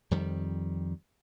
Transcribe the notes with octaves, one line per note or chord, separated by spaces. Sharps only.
F2 D#3 G3